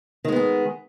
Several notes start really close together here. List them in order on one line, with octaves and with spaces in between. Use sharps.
D#3 G#3 B3 G#4